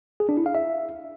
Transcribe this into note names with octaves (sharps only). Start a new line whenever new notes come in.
G#4
D4
E4
F5
E5